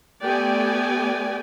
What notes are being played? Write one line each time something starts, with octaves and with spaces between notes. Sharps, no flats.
A3 B3 G4 D5 G5 G#5